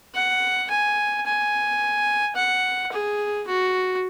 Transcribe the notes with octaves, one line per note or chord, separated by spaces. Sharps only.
F#5
G#5
G#5
F#5
G#4
F#4